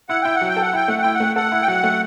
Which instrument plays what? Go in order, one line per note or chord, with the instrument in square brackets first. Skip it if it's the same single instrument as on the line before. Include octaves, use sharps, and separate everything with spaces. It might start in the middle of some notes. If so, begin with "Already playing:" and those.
[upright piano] E4 [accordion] F#5
[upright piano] E4 [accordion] G5
[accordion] F#5
[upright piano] F#3
[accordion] G5
[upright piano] A4
[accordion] F#5
[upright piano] E4 [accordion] G5
[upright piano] A3 [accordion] F#5
[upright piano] E4 [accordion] G5
[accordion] F#5
[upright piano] A3
[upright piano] A4 [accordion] F#5
[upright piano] E4
[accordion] G5
[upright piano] F#3 [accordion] F#5
[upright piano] A3